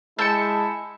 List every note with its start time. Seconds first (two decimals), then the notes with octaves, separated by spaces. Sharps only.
0.19 G#3 E4 A5 E6 G6 C#7